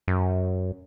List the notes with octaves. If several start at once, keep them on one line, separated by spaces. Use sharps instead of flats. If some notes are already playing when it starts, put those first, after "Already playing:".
F#2